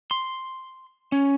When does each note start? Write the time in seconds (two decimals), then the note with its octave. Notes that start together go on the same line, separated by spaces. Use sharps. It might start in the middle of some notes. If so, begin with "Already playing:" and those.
0.11 C6
1.12 C#4